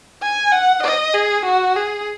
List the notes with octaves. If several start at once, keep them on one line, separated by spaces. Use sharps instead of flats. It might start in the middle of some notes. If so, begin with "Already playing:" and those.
G#5
F#5
D#5
G#4
F#4
G#4